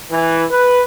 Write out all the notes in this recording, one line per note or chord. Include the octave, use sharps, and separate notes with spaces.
E3
B4